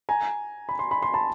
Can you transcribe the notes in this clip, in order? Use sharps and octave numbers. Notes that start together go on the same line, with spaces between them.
G#5 A#5
B5
C6
B5
C6
A5 B5